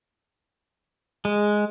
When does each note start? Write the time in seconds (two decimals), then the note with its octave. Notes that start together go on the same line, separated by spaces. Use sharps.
1.25 G#3